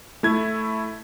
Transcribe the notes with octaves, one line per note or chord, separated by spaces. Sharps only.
A3 E4 G#6